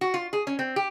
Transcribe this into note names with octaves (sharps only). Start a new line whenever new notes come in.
F#4
F4
G#4
C#4
C4
G4